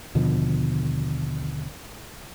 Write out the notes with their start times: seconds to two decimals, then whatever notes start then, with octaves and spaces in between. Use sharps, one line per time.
0.15 D#2 B2 D3 F3